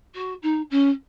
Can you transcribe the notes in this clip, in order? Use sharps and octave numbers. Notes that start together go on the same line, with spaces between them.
F#4
D#4
C#4